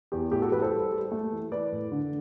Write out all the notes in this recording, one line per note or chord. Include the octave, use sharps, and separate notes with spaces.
E2 G4
A2 G4
F#4 A4
A2 G4 B4
A4 C5
G3
G3
A3
E3
E3 B4 D5
A2
D3